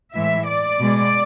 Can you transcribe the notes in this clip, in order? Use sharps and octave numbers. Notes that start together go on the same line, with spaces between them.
A2 E3 G#3 E5
D5
B2 G#3